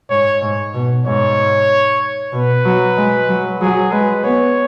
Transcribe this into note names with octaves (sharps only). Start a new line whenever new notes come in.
G#2 C#5
G#2
B2
G#2 C#5
B2 B4
F#3
G#3
F#3
F#3 G#4
G#3 B4
B3 C#5